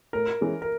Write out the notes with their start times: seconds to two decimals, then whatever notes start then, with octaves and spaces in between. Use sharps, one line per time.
0.13 A2 A#4
0.41 E3 G#3 C#4
0.62 A#4